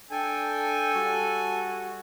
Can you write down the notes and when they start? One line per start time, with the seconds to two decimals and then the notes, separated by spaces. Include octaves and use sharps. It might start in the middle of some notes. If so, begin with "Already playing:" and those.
0.11 D4 A4 G5 G#5
0.95 G3 F#4